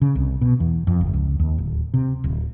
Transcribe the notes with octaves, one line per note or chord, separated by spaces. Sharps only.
C#3
C2
B2
E2
F2
G1
C#2
D#2
D1
C3
D1